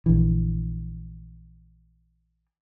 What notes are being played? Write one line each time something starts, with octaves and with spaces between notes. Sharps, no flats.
A#1 D3 E3